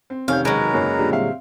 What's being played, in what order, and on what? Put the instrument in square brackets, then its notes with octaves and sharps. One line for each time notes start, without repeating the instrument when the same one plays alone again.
[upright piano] C4
[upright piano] F1 G6 [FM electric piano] C3 D#3 C#4 [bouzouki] F5
[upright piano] E1 D7 [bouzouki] F#3 G#3 [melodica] A#4 B4 A#5
[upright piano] F#2 C#3 A#3
[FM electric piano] A#2 D3 G3
[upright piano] C4 E5 F5